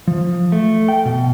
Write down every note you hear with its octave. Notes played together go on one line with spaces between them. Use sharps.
F3
A3
G5
B2